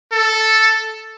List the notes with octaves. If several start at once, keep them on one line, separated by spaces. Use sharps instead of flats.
A4